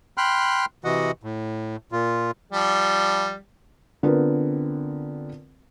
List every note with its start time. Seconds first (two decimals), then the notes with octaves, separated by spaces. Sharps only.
0.18 G5 B5 C6 F6 F#6
0.84 C3 E3 F#4 D#5 F#5
1.23 A2
1.92 A#2 F4
2.53 F3 G3
4.03 D3 B3 C4 F4 A#4